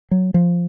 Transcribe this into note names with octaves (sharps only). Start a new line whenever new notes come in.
F#3
F3